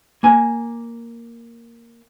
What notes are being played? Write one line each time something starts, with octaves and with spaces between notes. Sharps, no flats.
A#3 G#5